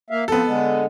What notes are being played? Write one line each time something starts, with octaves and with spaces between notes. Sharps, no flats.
A#3 E5 F5
F3 B3 C4 A4
D3 G#3